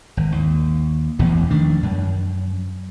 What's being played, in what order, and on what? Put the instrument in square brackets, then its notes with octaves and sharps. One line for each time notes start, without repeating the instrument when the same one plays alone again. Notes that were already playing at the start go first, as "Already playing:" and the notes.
[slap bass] G#1
D#2
E1 A1 E2 B3
D#3 F3 A3 D4
F#2